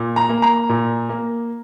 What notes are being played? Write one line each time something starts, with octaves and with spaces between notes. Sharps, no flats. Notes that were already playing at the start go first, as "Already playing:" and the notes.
Already playing: A#2
A#5
A#3
A#5
A#2
A#3